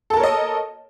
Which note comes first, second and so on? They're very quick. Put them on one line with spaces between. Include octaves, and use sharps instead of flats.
A4 A5 A#4 C#5 D#5